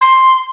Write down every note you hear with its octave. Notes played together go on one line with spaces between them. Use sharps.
C6